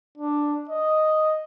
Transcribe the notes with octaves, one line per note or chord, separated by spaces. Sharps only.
D4
D#5